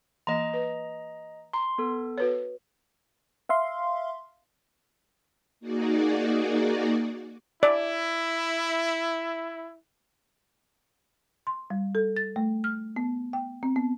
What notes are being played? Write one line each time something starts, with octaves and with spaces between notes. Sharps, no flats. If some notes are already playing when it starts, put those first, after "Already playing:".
E3 A#3 D#5 A#5
B4
A#5 C6
B3 A4
F#4 B4 C#5
E5 F5 C6
A#3 D#4 F#4 G#4 D5
E4 D5
C6
G3
A4
A6
A3
F6
B3
G5
C4
B3